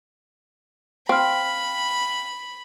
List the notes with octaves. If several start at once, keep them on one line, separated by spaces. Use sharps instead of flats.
C4 F5 G5 B5 F6